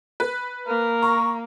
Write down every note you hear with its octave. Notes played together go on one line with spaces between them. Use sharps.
B4
A#3 A#4
A#5 C#6